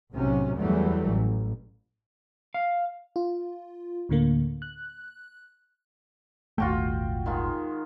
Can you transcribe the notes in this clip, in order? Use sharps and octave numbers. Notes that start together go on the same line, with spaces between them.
B1 A2 C3 F#3 C#4
E2 E3 F#3 G3 A3
A1
F5
F4
D2 A2 D3 A#3
F#6
D#1 G#1 A3 F4 F#4 G5
D#3 G#3 F4